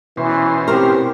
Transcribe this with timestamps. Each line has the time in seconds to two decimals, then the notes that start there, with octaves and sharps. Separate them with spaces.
0.17 B2 E3 C#4 C5
0.68 C4 E4 G4 A#4